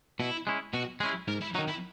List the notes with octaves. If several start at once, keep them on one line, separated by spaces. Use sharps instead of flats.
B2 E4
G#3 C#4 E4
B2 F#4
G#3 C#4 E4 G#4
G#2 A#4
E4
D#3 F#3 D#4
E4